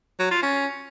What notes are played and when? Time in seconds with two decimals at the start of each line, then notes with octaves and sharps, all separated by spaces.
0.19 F#3
0.31 F4
0.43 C#4